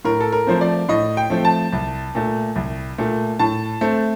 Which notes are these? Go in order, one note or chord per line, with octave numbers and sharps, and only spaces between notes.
A2 A#4
A4
A#4
F3 A3 C4 C5
D5
A2 D#5
G5
F3 A3 C4
A5
C2
A#2 A3
C2
A#2 A3
A2 A5
A3 C4